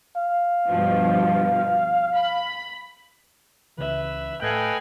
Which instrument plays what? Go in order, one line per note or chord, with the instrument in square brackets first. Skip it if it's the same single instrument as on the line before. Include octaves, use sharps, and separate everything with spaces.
[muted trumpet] F5
[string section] G2 B2 F3
B5
[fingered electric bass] C#2 C#3 E3 [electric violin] B4 E5
[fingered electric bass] A2 [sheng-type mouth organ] A4 B4 D#5 [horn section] F5 G5 G#5 [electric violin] F#6